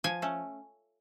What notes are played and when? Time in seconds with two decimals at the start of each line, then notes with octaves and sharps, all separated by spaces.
0.04 F3 G#5
0.22 A3 C#4